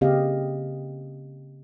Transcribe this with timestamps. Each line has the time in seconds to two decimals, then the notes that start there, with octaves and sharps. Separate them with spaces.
0.01 C#3 A#3 C4 G4 D#5 F5